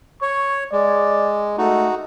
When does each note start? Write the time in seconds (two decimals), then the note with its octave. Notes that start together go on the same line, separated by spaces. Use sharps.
0.22 C#5 C#6
0.73 G#3 D5
1.58 A3 D#4 F#4